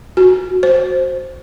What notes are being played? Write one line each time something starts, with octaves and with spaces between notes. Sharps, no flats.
F#4
C5